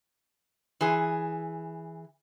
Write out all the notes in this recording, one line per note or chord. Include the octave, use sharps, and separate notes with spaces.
E3 G#4